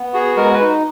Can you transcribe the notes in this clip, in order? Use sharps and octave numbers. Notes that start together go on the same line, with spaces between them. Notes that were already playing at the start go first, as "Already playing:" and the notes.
Already playing: B3
F#4 G#4
G#3 A#4
B4
D#4